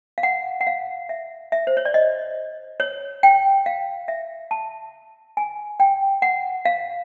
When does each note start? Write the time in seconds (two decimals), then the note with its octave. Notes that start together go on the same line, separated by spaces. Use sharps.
0.18 F5
0.23 F#5
0.61 F#5
0.67 F5
1.09 E5
1.52 E5
1.67 C5
1.77 C#5
1.85 D5
1.94 D#5
2.80 C#5
3.23 G5
3.66 F5
4.08 E5
4.51 A5
5.37 G#5
5.80 G5
6.22 F#5
6.65 F5